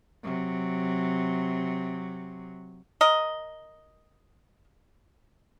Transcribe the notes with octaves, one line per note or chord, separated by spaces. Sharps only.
C3 F#3
A#4 D#5